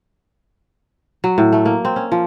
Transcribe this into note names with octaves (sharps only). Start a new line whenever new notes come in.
F#3
A2
A3
A#3
C4
C#4
F3